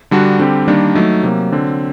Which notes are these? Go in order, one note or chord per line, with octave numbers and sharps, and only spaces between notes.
D3 G3 D4 F#4
D3 G3 C4 G4
D#3 G3 A#3 D4
F#3 A3 D#4
C3 F#3 A#3
D3 F#3 C4